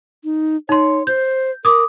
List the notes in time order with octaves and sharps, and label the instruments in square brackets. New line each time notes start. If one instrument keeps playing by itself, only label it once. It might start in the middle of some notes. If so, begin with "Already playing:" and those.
[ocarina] D#4
[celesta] D#4 C6 [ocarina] C#5
[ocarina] C5 [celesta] G6
[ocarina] A#4 [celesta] D6 D#6